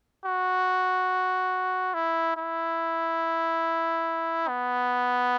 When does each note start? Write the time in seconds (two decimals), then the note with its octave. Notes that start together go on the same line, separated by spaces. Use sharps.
0.24 F#4
1.94 E4
2.37 E4
4.48 B3